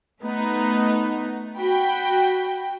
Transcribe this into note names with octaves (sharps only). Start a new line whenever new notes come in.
A3 B3 D#4
F#4 G5 B5